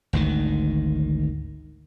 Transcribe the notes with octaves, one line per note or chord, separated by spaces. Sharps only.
G#1 D2 D#3